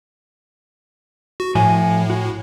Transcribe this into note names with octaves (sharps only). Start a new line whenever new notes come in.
F#4
A2 F3 A3 G#5
F#4